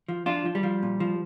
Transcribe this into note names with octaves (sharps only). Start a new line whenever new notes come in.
F3
F3 D4 F4
F3
G3
F3
A#2
F3